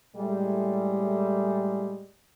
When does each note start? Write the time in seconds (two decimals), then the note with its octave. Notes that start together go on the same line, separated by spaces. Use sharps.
0.15 A2 G3 G#3